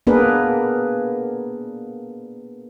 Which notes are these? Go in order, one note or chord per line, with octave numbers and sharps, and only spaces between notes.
A#3 B3 D4 G#4 A#4 B4